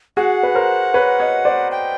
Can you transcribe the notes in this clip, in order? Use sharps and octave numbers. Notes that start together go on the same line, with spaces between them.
F#4 G#4 F#5
B4
A#4 C5
B4 C#5
C#5 D#5
C5 D5
G5